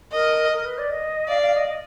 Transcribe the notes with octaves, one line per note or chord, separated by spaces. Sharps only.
A#4 D#5
A#4
B4
D5
D#5
D5 F5
F5
D#5
D#5